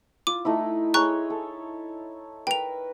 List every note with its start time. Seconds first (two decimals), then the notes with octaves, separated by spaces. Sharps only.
0.27 F4 D6
0.45 A3 D#4 E4
0.94 G#4 C#5 A#5 C6 C#6 F#6
1.30 A4
2.47 A#4 B4 G5 F7